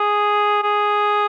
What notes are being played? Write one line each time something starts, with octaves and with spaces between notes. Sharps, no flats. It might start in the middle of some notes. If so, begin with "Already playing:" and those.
Already playing: G#4
G#4